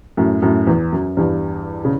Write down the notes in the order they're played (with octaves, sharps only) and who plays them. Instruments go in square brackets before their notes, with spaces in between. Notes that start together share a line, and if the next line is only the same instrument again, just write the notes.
[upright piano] F#2 A2
F#2 A2
E2
F#2
E2 G2
C#3